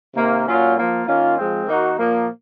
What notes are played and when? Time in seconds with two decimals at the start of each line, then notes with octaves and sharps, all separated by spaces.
0.16 C3 D#3 A#3
0.46 A#2 F#3 A#3 C#4 F4
0.76 F3 A#3 F4
1.07 D#3 A#3 C#4 F4
1.37 F3 G#3 C4
1.67 D#3 A#3 D#4 F#4
1.97 A#2 F3 A#3